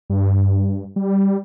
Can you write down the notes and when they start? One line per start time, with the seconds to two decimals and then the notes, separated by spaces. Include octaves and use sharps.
0.10 G2
0.96 G3